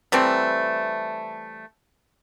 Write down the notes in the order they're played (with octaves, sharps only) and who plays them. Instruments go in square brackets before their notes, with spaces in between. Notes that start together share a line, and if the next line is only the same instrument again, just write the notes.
[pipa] E3 G3 A3 C4